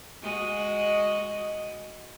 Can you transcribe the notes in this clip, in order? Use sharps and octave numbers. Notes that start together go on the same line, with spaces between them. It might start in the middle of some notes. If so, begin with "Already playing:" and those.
G#3 F#4 D#5